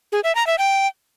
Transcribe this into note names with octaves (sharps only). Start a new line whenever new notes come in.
G#4
E5
A#5
E5
G5